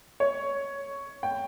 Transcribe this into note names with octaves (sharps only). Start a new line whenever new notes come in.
C#5
G5